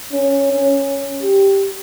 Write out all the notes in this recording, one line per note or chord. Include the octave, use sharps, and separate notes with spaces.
C#4
C#4
G4